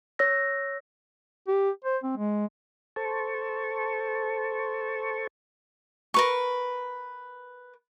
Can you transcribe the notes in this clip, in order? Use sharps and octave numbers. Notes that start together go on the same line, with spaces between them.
C#5 E6 A#6
G4
C5
C4
G#3
A4 C5 A5 C#6
A#4 B4 C#6